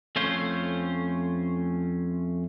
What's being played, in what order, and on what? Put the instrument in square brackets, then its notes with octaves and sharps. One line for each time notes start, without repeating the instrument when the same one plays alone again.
[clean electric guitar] F2 A3 C#4 F4 C5